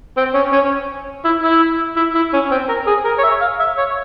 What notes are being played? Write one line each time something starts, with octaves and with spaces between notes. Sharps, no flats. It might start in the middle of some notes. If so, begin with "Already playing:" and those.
C4
C#4
C#4
E4
E4
E4
E4
C#4
C4
A#4
G#4
A#4
C#5
E5
F5
E5
C#5